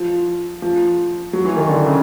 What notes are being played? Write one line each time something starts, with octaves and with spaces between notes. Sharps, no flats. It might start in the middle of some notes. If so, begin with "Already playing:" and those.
Already playing: F3
F3
F#3
E3
D#3
D3
C#3